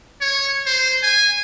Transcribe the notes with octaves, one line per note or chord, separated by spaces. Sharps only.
C#5
C5
G#5